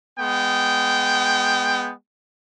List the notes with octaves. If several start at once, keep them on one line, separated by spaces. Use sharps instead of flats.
G#3 B3 G5